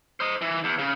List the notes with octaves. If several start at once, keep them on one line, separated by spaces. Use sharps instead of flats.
C5 D#5
E3
E2
C#3